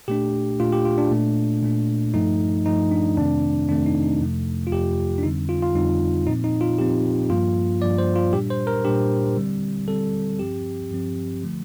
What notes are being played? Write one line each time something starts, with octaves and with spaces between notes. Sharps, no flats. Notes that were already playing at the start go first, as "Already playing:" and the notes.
A#2 A3 D4 G4
A#2 A3 D4 F4
G4
F4
D4
A#2 A3 D4
A#2 A3 D4
G2 F3 A3 D#4
G2 F3 A3 D#4
D4
F2 C3 D#3 A3 C4 D4
F2 C3 D#3 A3 C4 D4
D#4
D#4
F2 C3 F3 A3
F4
F2 C3 F3 A3 G4
D4
F2 D3 G3 C4 D#4
F4
F4
F2 D3 G3 C4 D#4
A#2 F3 C4 D#4
D#4
F4
A#2 F3 C4 G4
G2 F3 A#3 F4
G2 F3 A#3 D5
C5
F4
A#2 G3 D4 G4
C5
A#4
A#2 G3 D4 G4
D3 G3 C4
D3 G3 C4 A4
G2 F3 C4 G4
G2 F3 C4
D3 F3 A3